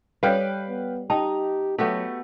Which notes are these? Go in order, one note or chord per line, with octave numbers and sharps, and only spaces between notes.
G3 A4 B4 C#5 F5 G5
B3
D#4 G4 G5 A5 A#5
F#3 A3 B3 F#4 G4